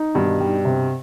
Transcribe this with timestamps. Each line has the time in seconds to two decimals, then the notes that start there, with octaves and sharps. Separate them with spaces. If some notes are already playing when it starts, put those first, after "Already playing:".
Already playing: D#4
0.15 G2 B2 D#3
0.41 G3
0.65 C3